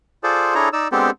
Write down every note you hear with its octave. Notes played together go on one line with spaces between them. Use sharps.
F4 G#4 A4 C5 D5
D4 E4 G#4 A4 C#5 A#5
D#4 D5 E6
G#3 B3 C4 D4 G4 A4